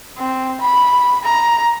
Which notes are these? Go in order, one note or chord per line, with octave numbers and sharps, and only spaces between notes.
C4
B5
A#5